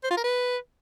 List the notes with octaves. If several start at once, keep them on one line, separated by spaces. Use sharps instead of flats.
C5
F4
A#4
B4